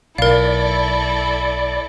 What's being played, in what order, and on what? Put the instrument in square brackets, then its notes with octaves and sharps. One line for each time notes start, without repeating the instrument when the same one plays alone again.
[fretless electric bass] B1 [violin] E4 A4 [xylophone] A#4 F5 [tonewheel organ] D5